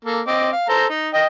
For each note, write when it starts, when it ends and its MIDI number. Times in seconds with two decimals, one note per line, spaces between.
0.04 0.21 58
0.04 0.21 69
0.27 0.50 60
0.27 0.50 75
0.27 0.50 86
0.52 0.66 77
0.69 0.85 69
0.69 0.85 72
0.69 0.85 82
0.89 1.08 63
1.14 1.27 75
1.14 1.27 79